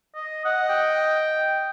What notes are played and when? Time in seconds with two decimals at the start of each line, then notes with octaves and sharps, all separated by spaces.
0.15 D#5
0.45 D#5 F#5
0.69 G5